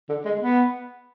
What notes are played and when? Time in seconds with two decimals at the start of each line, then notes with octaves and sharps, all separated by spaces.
0.09 D3
0.25 G#3
0.41 B3